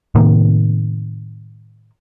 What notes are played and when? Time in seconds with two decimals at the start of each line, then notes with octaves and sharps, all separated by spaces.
0.15 A2 C3 D#3 A#3